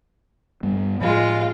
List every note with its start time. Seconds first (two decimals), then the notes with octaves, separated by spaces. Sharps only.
0.63 G2 G3 B3
1.01 A2 F3 G#3 F4